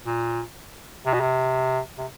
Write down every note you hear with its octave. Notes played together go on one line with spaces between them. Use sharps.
A#2
C3
B2
C3
C3